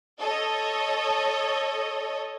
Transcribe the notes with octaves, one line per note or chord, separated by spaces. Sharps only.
A4 C#5 D#5 D#6